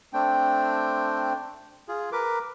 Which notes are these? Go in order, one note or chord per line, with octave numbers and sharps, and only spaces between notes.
A3 C4 D4 G5
F4 G#4
A#4 B4 D6